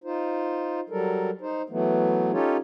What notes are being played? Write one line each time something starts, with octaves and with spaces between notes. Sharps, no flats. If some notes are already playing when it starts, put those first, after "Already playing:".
D#4 F4 C5
F#3 G3 A4 A#4
D#4 C5
E3 F#3 A3 B3
C#4 D#4 F4 G4 A4 C#5